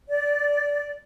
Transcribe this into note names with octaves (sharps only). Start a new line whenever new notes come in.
D5